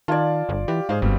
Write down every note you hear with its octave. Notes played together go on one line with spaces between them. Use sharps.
D#3 F4 D5 A5 G#6
G1
E3 G4
G#2 G#4 C5 F5
G1 B2 G3 C4